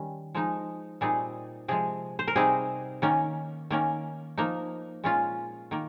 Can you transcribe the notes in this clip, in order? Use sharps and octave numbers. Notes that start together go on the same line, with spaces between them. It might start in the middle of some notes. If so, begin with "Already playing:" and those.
Already playing: D#3 G3 C#4
F3 G#3 D#4
A#2 G3 C4 D#4 G#4
C3 F3 G#3 G#4
C5
A#4
C3 G3 C4 D#4 G#4
D#3 A#3 C#4
D#3 A#3 C#4
F3 A#3 D#4
A#2 G#3 C#4 F4
D#3 A#3